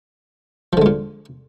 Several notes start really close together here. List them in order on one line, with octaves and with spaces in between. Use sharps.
F3 D3 G#3 A#2